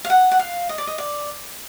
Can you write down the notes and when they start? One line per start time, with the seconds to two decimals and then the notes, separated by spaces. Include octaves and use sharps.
0.05 F5
0.10 F#5
0.32 F#5
0.39 F5
0.69 D#5
0.78 D5
0.87 D#5
0.98 D5